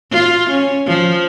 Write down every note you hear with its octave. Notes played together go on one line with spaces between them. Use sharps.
F4
C#4
F3